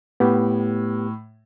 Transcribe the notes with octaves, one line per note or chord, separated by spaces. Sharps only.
A2 B3 G4